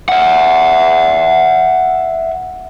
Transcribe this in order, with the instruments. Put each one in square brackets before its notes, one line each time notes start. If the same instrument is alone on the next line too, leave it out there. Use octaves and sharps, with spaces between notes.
[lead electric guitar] E5 F#5